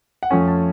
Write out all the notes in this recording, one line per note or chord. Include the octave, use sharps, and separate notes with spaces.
F#5
F2 F3 A3 C#4 G#5
A5